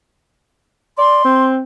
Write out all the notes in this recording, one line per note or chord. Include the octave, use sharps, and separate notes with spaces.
D5 C6
C4